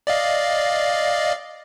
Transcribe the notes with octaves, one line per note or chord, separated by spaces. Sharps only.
D5 D#5 F5